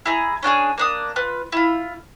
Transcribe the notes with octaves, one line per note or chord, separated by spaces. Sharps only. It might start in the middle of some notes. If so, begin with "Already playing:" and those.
E4 G#4 A#5
C#4 D4 F4 G#4
A#3 D4 D#6
F4 B4
E4 F4